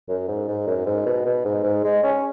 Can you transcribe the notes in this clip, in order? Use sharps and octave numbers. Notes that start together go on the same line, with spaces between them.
F#2
G#2
G#2
F#2
G#2
B2
B2
G#2
G#2
G#3
C#4